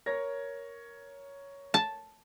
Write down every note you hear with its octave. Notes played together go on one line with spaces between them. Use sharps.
A#4 C#5 A#6
A5